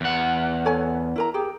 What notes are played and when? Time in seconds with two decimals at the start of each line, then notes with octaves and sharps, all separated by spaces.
0.01 E2 F#5
0.65 A4 C#5 G#5
1.16 E4 A#4 A#5
1.34 G4 G#4